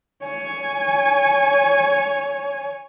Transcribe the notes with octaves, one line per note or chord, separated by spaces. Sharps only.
C#5 G#5